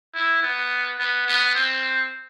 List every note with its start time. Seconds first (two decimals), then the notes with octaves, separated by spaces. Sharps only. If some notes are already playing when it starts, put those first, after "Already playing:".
0.15 E4
0.42 B3
0.98 B3
1.26 B3
1.54 C4